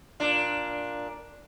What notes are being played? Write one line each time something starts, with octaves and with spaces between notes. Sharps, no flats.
A#2 D4